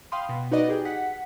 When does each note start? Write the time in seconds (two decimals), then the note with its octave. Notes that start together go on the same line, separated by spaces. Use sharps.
0.12 F5 G5 B5 C6 D#6
0.29 B2
0.51 D#4 F#4 B4 D5 D#5
0.69 G4 G#4 G5
0.85 F#5 B6